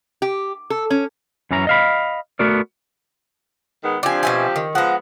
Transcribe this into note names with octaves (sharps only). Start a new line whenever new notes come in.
G4
A4
C#4
F#2 E3 C#4 A#5
D#5 F5 B5
A3 B3 F#4 A#4 D5
D#3 G#3 B3
F3 C4 D4 G4 G#5
B2 E5 G#5
D#3
F3 G#3 B3 F#5 A#5